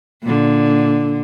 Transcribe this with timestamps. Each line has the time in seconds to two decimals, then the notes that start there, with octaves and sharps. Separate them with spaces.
0.23 A#2 D3